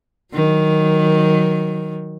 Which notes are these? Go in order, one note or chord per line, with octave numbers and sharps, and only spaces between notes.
D#3 F#3